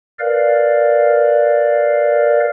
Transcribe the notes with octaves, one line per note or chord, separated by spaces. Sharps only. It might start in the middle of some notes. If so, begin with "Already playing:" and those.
A#4 B4 D5 F5